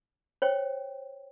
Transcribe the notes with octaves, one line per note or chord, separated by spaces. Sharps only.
C5 C#5 G5